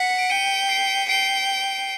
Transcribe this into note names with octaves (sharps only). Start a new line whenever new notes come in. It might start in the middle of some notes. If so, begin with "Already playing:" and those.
Already playing: F#5 B6 C#7
D7
G5 C#7 D#7
C7 D7
G5 C7 D7